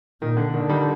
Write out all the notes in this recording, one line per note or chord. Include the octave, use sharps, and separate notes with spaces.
A#2 D#3
D3
D3 D#3
D#3 G3